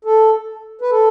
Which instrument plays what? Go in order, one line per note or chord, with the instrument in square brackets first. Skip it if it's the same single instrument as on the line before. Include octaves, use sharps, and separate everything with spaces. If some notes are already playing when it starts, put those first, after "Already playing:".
[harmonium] A4
B4
A4